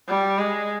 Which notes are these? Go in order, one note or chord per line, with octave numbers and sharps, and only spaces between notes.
G3
G#3